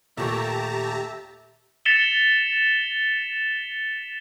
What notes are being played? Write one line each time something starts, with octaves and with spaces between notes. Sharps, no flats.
D#2 A#2 A3 G4 E5 A5 A#5 C#6
A6 B6 C#7 E7 F7 G7